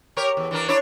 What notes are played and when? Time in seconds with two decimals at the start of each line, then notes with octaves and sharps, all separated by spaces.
0.17 G4 A#4 C#5
0.37 E2
0.51 E3 D4 A#4
0.68 D4 E4 C#5